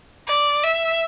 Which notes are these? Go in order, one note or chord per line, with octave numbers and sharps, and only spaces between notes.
D5
E5